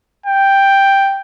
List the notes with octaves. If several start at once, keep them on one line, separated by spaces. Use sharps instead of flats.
G5